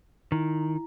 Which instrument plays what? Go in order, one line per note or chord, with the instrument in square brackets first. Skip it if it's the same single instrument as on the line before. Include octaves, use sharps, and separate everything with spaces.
[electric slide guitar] D#3 [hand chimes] E4 A#5